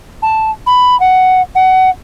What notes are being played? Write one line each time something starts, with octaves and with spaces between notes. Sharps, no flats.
A5
B5
F#5
F#5